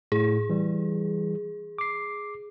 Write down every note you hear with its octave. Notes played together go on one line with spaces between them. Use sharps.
A2 G#4
E3 G3
D6 C7